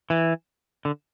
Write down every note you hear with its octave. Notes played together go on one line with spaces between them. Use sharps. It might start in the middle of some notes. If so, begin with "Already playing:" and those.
E3
D3